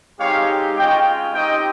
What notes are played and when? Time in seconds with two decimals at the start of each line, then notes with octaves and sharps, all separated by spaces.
0.20 G#3 C4 D#4 G4 C#5 F5
0.77 G#3 C#4 F4 D#5 G5
1.33 C4 D#4 G4 D#5 G5